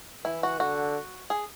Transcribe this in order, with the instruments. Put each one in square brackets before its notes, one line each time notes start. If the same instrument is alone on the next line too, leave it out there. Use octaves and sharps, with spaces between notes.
[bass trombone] E3 [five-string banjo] E4
[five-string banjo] F#4
[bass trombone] D3 [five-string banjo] F#4
[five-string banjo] G#4